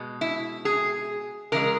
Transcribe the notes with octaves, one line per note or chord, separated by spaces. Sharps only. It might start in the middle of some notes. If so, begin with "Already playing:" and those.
Already playing: B2 G#3
E4
G#4
C#3 E3 G#3 A#4